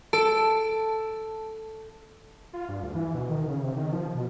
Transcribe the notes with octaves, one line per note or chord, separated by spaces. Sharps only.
A4 A5 D7
F4
G2
D2
E3
B2
D#3
C#3
C3
D#3
F3
B2